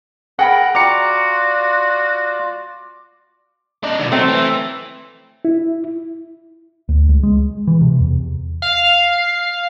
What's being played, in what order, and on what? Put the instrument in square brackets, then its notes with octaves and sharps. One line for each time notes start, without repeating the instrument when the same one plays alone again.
[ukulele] G#4 G5 B5 [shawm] A#4 [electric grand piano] F#5
[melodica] F4 D5 [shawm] F#4 [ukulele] A#5 [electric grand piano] D6 C#7
[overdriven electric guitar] D4 D#4
D#2 B2
[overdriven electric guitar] F#3 [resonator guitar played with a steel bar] A3 C4
[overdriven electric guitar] E3
[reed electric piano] E4
[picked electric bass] D2
C#2
G#3
E3
C3
E2
[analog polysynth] F5